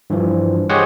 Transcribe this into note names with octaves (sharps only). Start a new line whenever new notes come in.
G2 E3 F3
G4 G#4 C5 C#5 D#5 F#5